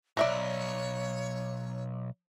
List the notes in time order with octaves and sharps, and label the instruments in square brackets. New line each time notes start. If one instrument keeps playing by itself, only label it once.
[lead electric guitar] B1 G#2 [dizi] C#5 [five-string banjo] D5 E5 A#5